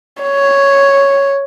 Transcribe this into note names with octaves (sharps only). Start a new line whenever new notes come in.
C#5